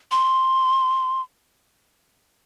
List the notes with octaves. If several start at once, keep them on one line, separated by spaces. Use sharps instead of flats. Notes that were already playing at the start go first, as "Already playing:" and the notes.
C6